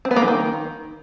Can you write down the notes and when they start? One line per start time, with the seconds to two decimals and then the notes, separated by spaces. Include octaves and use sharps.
0.05 C4
0.11 B3
0.16 A#3
0.22 E3
0.28 D#3